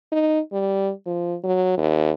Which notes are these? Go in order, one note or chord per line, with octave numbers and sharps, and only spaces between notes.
D#4
G3
F3
F#3
D#2